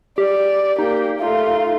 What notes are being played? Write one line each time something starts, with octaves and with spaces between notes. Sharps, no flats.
G4 D5
A#3 D#4 G4
A3 F4